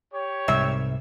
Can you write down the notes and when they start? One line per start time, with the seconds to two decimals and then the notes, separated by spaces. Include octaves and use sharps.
0.13 G4 C#5
0.48 C2 G#2 C3 E5